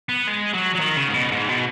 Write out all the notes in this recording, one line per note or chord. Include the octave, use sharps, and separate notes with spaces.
B3
G#3
F#3
F#3
D#3
C#3
G#2
B2
G#2
B2